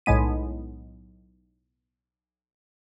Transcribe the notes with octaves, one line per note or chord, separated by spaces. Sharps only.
B1 A2 G#3 B3 D#7